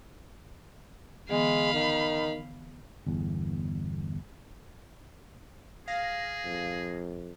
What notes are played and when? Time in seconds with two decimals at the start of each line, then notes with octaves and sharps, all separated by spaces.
1.30 D3 E3 G#3 B3 F5 B5
1.73 D#3
3.06 G1 E2
5.88 G#4 F5 A#6
6.44 F2